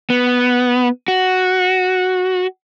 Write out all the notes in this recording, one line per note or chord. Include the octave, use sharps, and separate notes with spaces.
B3
F#4